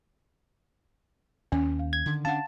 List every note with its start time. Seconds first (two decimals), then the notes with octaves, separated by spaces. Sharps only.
1.52 D#2 C#4
1.79 F5
1.93 G#6
2.06 D3 D#3
2.25 D3 C#4 D4 F5 F#5 A5